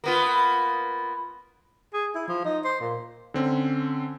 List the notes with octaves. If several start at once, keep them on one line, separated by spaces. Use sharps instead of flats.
A#3 B3 F4
G#4
E4
F3
D#4
C5
A#2
D3 C4 C#4